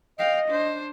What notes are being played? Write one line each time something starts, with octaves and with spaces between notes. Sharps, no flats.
D#5 F5 G5
D4 C5